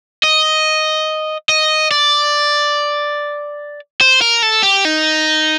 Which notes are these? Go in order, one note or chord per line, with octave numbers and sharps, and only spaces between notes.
D#5
D#5
D5
C5
A#4
A4
G4
D#4